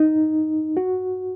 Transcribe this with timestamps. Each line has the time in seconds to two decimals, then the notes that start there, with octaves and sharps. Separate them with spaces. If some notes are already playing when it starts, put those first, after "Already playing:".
Already playing: D#4
0.77 F#4